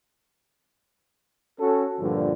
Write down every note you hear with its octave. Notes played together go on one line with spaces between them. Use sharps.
C#4 F#4 A4
G2 A#2 D3 F3